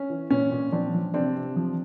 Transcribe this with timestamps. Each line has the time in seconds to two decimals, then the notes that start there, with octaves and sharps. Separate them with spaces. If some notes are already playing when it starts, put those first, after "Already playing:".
Already playing: C#4
0.10 E3
0.30 A#2 C#4
0.52 A#2
0.72 F3 C4 D4
0.94 F3
1.14 C3 C4 D4
1.36 C3
1.56 F3